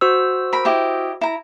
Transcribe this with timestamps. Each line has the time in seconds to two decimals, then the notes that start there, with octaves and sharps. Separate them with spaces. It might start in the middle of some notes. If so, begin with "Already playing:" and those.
0.01 F#4 C5 E6
0.53 A#4 B5
0.65 E4 G4 D#5
1.21 E4 A#5